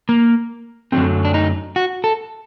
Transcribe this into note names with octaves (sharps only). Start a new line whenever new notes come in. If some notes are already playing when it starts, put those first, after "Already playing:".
A#3
F#2 D3 F#3 A3 C4
D4
D#4
F#4
A4